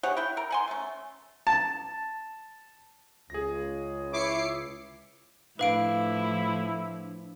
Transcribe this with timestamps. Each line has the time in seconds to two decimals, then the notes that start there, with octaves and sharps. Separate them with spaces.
0.03 G4 G#4 C#5 F#5
0.17 E4 E5 G5
0.37 A#4
0.50 F#5 G#5 C6
0.68 A3 C#4
1.47 A5
3.30 C#2 G#4 A#6
4.12 E4 C#5 D6 C7 C#7
5.59 A2 F3 D4 E4 B4 F5 D7